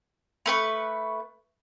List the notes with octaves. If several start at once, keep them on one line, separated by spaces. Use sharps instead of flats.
A3 B4 C#6